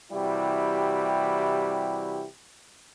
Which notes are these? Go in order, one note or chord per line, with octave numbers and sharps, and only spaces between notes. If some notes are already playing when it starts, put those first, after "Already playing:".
C3 E3 G3 E4 F#4 G4